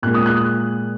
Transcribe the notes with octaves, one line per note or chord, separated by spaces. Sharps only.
A#2 G#3 F#6
D#6
F#6